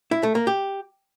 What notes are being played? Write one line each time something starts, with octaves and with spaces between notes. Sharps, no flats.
E4
A3
A#3
G4